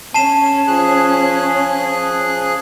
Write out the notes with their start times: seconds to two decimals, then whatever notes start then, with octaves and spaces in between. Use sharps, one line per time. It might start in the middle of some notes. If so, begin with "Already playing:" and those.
0.14 C#4 A5 C7 E7
0.68 F3 G#4 F#6